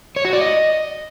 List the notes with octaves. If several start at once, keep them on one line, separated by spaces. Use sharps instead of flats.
C#5
F#4
D5
D#5